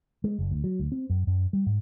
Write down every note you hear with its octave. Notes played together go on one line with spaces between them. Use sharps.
G#3
F#1
D2
F#3
D2
C4
F#2
F#2
G3
G#2